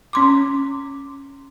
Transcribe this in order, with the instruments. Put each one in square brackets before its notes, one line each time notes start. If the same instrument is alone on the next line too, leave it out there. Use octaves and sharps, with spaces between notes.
[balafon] C#4 C6 D6